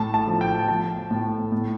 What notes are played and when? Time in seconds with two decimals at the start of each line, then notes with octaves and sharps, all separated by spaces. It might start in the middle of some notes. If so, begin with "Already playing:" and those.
Already playing: A2 A5
0.14 A5
0.27 F3
0.41 G5
0.68 F3 A5
1.11 A2
1.52 A2